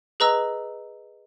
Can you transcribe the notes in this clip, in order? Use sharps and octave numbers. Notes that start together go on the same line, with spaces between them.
G#4 B4 D#5 A#5 E6